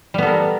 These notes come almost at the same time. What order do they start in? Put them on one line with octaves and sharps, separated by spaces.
G3 B3 A4 A#4